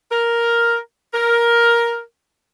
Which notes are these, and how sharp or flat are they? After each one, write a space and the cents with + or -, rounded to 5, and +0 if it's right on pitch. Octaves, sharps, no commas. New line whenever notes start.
A#4 +5
A#4 +10